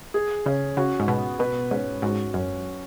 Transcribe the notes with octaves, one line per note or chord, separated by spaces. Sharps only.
G#4
C#3 C#4
C#3 F#4
G#2
B2 B3
B2 B4
G#2 C#4
G#2 F#4
F#2 C#4